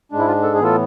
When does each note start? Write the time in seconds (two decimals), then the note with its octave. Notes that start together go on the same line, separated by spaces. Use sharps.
0.12 G#2 G#3 D4
0.19 E4
0.28 F4
0.43 A4
0.54 G#4
0.59 A2 E3 B3 F4 A4